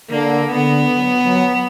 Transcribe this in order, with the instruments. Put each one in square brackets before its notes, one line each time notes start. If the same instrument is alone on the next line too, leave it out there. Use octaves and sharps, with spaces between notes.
[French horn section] D3 [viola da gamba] A#3
[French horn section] D3 [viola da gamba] B3
[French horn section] F#3
F#3